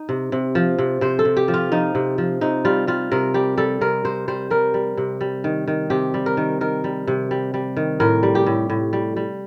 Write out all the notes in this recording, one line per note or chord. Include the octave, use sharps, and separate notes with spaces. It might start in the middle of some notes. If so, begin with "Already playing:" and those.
Already playing: D#4
C3
C3
F3
C3
C3 C5
A4
C3
G4
F3
F4
F3 D#4
C3
F3
C3 D#4
G3 F4
G3 F4
C3 A#4
G3 G4
G3 A4
C3 A#4
C3 C5
G3 C5
G3 A#4
G3
C3
G3
D#3
D#3
C3 G4
G3
A#4
D#3
D#3 A#4
G3
C3
G3
G3
D#3
A2 A#4
G3
G4
A2
A2
G3
G3